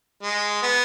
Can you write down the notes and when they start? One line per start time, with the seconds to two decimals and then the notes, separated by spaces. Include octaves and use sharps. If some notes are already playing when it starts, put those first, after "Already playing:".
0.23 G#3
0.63 B3